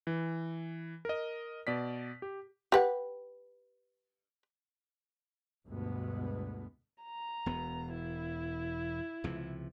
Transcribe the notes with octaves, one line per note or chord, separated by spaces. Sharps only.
E3
A#4 D#5
B2 D5 B6
G4
G4 B4 F#5
G1 D2 B2 G#3 B3
A#5
E1 B3
E4
C#2 C3 F3